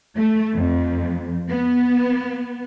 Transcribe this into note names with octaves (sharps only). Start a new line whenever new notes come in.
A3
F2
B3